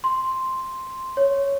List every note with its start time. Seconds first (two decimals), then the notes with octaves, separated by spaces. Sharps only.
0.04 C6
1.17 C#5